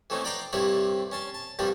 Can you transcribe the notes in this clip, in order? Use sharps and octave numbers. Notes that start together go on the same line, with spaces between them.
E3 A3 C4 C#4 D#4
D5 F#5 G5 A#5 C6 D6
C2 G2 C4 E4 C#5 D5
C#4 A5 C6
A5
C2 G2 F3 G3 D4 G4